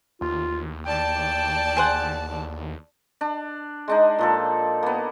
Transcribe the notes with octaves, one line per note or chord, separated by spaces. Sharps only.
D#2 F4
D#2 D5 G5 A5
G#4 C5 F#5
D4
G#3 D4 D#4
A#2 F3 A4
A#3 B3